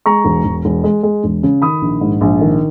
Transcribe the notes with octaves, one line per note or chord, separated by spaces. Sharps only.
G#3 A#5 C#6
E1
E1
E1
G#3
G#3
E1
C#3
D#3 B5 D#6
A#1
G#2
A#1
D#3